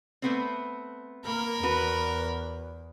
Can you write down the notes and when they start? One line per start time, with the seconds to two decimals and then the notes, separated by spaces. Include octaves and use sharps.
0.22 A3 B3 C4
1.25 A#3 A#4 B5
1.63 E2 F#4 B4